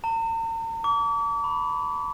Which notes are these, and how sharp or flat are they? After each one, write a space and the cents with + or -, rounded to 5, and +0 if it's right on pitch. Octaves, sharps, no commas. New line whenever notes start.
A#5 -45
D6 -40
B5 +5